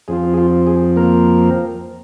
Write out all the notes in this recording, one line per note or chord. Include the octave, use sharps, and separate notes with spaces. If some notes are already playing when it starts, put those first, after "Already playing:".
F2 F3 C4 F4 G#4
G#4
F4
G#4
A#3 A#4